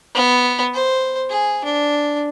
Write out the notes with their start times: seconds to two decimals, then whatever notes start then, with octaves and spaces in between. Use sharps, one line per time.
0.15 B3
0.74 C5
1.30 G#4
1.65 D4